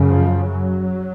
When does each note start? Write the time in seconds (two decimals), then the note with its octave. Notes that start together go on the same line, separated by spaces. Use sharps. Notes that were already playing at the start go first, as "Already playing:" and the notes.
Already playing: F#2 C#3
0.08 F3
0.49 F#3